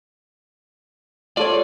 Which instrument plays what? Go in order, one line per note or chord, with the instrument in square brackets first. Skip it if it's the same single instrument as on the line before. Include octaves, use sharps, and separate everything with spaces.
[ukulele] F4 A4 C#5 [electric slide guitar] D5